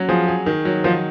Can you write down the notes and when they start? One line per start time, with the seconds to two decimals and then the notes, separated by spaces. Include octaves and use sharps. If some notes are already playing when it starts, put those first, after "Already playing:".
Already playing: F#3 C#4
0.09 F3 G#4
0.28 G#4
0.46 D#3
0.65 F#3
0.84 D#3 F3